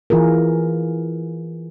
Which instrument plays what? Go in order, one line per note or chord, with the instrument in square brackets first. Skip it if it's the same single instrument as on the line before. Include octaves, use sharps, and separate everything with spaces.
[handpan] E3 F4 G#4 A#4